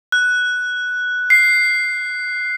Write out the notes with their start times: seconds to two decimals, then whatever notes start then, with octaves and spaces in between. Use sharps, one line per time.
0.12 F#6
1.30 C7